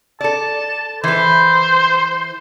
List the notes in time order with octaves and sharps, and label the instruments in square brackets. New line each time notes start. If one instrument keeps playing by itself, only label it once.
[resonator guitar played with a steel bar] A4 D5 [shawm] A5
[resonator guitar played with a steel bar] E3 B4 [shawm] C5